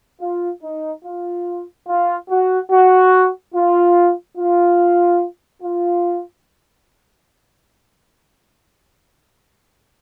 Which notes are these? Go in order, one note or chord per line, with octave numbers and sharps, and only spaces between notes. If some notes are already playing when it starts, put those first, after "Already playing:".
F4
D#4
F4
F4
F#4
F#4
F4
F4
F4